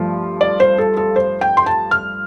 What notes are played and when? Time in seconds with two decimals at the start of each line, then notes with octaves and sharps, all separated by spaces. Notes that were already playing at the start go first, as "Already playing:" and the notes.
Already playing: G2 F3 A3 F4
0.41 D5
0.60 C5
0.78 A4
0.97 A4
1.16 C5
1.41 G5
1.57 C6
1.66 A5
1.91 F6